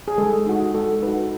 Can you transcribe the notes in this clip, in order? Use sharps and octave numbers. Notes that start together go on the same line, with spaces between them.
G#4
G#3 A4
D#4 F#4
G#3 A4
D#4 F#4 B4